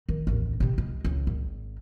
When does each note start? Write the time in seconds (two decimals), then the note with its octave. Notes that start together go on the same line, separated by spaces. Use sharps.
0.09 D#3
0.27 A1 D#2
0.60 C3 C4
0.78 G#3
1.04 C#2
1.27 G#1